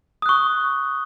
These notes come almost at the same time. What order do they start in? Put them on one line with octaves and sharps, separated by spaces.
D#6 F#6 C#6